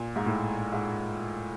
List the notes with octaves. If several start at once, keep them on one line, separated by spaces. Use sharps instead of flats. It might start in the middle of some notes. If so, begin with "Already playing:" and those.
Already playing: A#2
G#2
A2
G#2